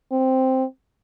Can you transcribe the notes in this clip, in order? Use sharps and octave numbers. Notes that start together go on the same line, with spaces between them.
C4